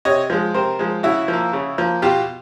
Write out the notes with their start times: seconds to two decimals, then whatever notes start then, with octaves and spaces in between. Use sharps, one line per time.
0.05 C3 C#5 D#5
0.30 F3 G#3
0.54 C3 A#4 C5
0.79 F3 G#3
1.03 C#3 E4 F#4
1.28 F3 A#3
1.53 C#3
1.78 F3 A#3
2.02 B2 F4 G4